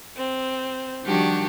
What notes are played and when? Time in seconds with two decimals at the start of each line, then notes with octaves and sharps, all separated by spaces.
0.16 C4
1.04 D#3 F3 G3 D4 F#4 G4